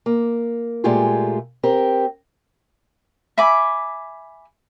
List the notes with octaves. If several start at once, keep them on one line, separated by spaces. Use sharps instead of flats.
A#3
A#2 G#3 A3 F4 G4 G#4
C4 G4 A#4
E5 G#5 B5 D6